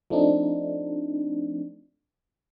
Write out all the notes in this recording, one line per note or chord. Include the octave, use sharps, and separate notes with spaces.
F3 A3 C4 D4 D#4